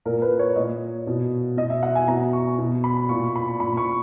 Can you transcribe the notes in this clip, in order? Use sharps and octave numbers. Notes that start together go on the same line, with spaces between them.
A#2 A#4
B4
C#5
A#2 D#5
B2
B2 D#5
E5
F#5
G#5
B2 A#5
C#6
B2
B5
A#2 C#6
B5
A#2 B5
C#6